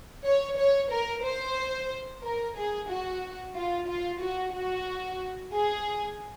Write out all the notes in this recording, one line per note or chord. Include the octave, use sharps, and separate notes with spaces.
C#5
C#5
A#4
C5
A#4
G#4
F#4
F4
F4
F#4
F#4
G#4